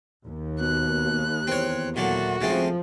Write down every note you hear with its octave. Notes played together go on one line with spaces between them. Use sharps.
D#2
B2 F#6
E2 C4 C#5
A#2 F#3 A3 F#4
G#1 C#3 F3 A3 C4